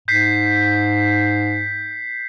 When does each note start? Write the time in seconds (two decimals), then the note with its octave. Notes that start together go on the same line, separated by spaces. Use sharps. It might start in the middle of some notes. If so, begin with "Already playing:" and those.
0.08 G#2 G6 B6 C7